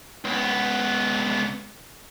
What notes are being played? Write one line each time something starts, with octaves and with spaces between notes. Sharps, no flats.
C#2 B3